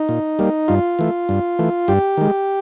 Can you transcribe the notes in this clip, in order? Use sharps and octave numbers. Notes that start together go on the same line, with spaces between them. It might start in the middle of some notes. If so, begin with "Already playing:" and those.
Already playing: D#4
A#2
G3 A#3
G2 F4
E3 A3
G2
E3 A3
G2 G4
D#3 G#3